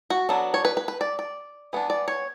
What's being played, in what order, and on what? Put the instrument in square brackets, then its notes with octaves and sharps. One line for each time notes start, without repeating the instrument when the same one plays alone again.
[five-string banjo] F#4
F#3 B3 D4 A4
C#5
B4
B4
B4
D5
D5
E3 B3 D4
D5
C#5